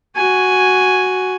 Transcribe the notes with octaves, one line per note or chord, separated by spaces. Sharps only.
F#4 G#5